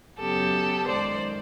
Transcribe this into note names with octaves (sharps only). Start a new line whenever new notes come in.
F#2 C#3 F#3 B3 G4 A4
F#2 D#3 G#3 C5 D5